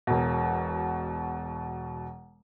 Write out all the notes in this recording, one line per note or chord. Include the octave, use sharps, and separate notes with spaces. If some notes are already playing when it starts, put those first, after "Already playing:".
E1 B2